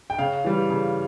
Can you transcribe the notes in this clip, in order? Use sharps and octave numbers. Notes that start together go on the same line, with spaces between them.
G5
C#3 F5
E3 G3
C#3